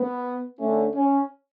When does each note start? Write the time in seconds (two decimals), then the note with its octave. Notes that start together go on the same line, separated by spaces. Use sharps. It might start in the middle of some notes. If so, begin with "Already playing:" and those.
Already playing: B3
0.59 D3 A3 C#4
0.95 C#4